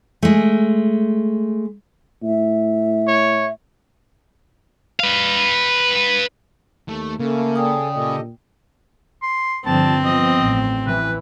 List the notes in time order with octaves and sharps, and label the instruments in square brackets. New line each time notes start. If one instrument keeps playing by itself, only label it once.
[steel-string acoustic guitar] G#3 A3
[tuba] A2 [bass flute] E5
[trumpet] C#5
[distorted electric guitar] B4 F5
[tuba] D#2 [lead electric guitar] A3
[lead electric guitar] C#3 [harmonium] A3 A4 [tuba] A#3
[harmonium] G#4 A4 [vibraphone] D5 G5 D#6
[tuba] A#2 [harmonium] G4 A4 D#5
[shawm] C6
[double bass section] G2 D3 F3 [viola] C4 [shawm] A5
[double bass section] F3 B3 [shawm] D#5
[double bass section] A1
[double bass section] E3 [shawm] B4